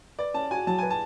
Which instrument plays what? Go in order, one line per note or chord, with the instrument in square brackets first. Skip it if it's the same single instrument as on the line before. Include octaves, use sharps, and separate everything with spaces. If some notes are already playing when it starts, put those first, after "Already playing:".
[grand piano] B4 [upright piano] D5
[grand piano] C#4 [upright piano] A5
[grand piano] F#4 [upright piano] G#5
[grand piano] F#3 [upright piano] A5
[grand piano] B4 [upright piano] G#5
[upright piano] A5